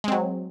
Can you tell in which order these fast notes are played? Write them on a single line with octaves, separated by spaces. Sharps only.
G#3 C4 F#3